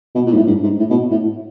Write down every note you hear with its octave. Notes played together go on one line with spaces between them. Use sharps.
B2
A#2
G#2
A2
G2
G#2
A2
B2
A2